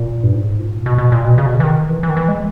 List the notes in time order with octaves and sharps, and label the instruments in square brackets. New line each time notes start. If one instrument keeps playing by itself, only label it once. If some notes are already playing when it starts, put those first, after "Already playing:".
Already playing: [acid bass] A#2
G2
G#2
A#2
B2
B2
A#2
B2
C#3
B2
C#3
E3
D#3
E3
E3
D#3
E3
G#3